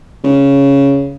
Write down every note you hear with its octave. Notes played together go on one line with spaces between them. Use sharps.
C#3